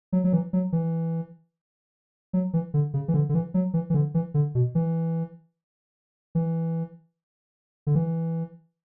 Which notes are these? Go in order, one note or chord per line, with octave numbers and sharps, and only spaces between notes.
F#3
F#3
E3
F#3
E3
F#3
E3
D3
C#3
E3
D3
D3
E3
F#3
E3
E3
D3
E3
D3
B2
E3
E3
D3
E3